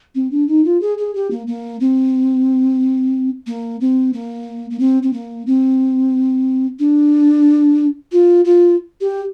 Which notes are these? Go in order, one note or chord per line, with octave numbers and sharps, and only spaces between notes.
C4
D4
D#4
F4
G#4
G#4
G4
A#3
A#3
C4
A#3
C4
A#3
A#3
C4
C4
A#3
C4
D4
F4
F4
G4